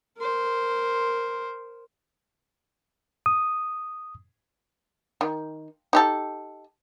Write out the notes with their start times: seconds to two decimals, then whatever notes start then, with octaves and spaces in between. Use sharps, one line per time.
0.17 A#4 C5
3.26 D#6
5.21 D#3
5.93 D#4 G4 A4